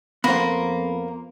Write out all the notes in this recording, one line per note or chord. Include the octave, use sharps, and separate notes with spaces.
F2 A#3 B3 C5 B5